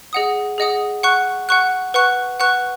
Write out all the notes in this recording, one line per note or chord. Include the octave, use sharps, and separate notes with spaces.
G#4 D#5 F#5 D#6
G#4 D#5 F#5 D#6
F#5 C#6 F#6
F#5 C#6 F#6
B4 F#5 C#6 F#6
B4 F#5 C#6 F#6